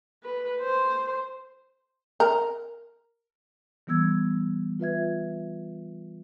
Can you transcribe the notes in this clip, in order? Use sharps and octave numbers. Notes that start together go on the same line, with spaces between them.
B4
C5
A#4
E3 G3 B3 E6 G#6
F4 B4 E5 G#6